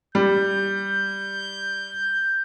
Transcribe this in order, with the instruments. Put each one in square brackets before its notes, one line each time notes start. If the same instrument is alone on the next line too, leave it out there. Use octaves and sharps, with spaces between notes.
[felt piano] G3 [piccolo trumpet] G6